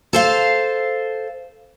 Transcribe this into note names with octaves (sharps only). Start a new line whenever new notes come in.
A4 C5 F5